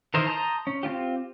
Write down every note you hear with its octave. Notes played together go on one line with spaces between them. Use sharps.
D#3 E3 A#4 C5 D#5
A5 A#5 C6 D#6 G6
C#4
C4 D4 F4 G4